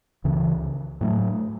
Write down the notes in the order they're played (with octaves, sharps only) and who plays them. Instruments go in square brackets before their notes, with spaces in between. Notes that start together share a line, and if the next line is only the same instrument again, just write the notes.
[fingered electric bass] C#2 C#3 E3
A2 F#3 A3